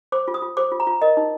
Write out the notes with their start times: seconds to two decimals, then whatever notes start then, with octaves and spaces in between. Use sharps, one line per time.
0.12 C5 D6
0.28 F4
0.34 D#6
0.42 F4
0.57 C5 D6
0.72 F4
0.80 A#5
0.87 F4
1.02 A#4 D#5
1.17 D#4